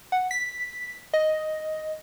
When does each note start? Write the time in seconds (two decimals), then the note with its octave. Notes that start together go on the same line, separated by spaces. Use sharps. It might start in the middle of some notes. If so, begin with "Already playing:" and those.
0.12 F#5
0.31 B6
1.14 D#5